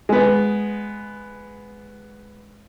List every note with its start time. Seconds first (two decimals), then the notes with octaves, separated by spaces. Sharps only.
0.09 G#3 B3